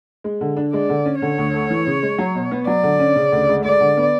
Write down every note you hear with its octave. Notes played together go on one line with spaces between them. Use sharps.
G#3
D3
D4
G#3 D5
D3
C#4
D3 C#5
D2
A3
E3
C#3
G#3
F#3
B2
B3
F#3 D5
D3
C#4
C#3
D2
G#3
G#3 D5
D3
B3